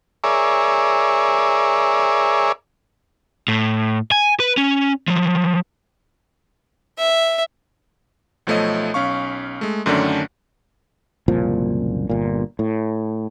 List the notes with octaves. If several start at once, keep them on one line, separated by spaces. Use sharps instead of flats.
G#4 A#4 C#5 D5 E5
A2
G#5
B4
C#4
F3 F#3
E5
B1 F3 A3 C#5 D#5
B1 C#4 F5 C#6
G#3 A3
F#2 D3 D#3 A3 C#4 D4
F#1 C2 A#2 F3
G1 A#2
A2